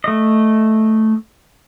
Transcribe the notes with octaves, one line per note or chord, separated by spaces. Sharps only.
A3 D#5